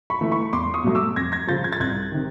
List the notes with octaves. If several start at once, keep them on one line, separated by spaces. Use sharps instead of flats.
B5 C#6
E3 A3
B5 C#6
E2 C6 D6
C#6 D#6
B2 F#3 A3
D6 E6
F2 G#6 A#6
G#6 A#6
C#3 F3 G6 A6
G#6
A6
C2 F#6 G#6
C3 D#3